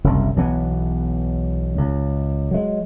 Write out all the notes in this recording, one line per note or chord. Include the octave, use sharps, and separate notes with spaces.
F#1 C2
B1 E3 B3
C#2
F#3 G#3